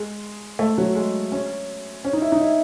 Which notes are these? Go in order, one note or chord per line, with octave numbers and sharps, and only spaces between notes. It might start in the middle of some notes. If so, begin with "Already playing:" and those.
Already playing: G#3
A3
F#3
G#3
C#4
C#4
D#4
E4
D#4
E4